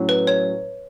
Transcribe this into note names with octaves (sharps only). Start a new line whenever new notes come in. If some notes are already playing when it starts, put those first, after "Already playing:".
Already playing: A2 F#3 C#4
B4
C#5